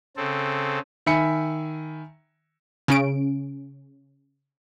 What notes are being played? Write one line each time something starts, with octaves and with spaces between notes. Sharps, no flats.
C#3 C4 A4
D#3 E5 G#5 B5 C#7
C#3 C#4 D7